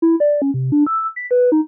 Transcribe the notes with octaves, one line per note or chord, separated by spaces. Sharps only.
E4
D5
C#4
C3
D4
E6
B6
B4
D#4